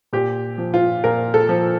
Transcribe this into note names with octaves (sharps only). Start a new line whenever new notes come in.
A#2 G4
F3
F4
A#2 A#4
A4
F3